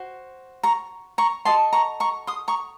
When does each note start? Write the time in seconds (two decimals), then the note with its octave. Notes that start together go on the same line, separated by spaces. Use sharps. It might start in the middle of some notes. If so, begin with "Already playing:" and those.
Already playing: F#4 C5
0.63 A#5 C#6
1.18 A#5 C#6
1.45 F#4 A4 D#5 A5 C6
1.73 A#5 C#6
2.00 A#5 C#6
2.27 C6 D#6
2.48 A#5 C#6